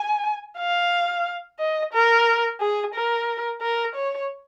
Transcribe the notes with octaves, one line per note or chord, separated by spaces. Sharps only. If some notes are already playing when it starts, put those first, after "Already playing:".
Already playing: G#5
F5
D#5
A#4
G#4
A#4
A#4
C#5